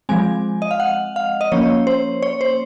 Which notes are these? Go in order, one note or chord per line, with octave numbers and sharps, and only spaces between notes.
F3 G#3 C4 G#5
D#5
F5
F#5
F5
D#5
F3 A#3 C#4 C#5
C5
C#5
C5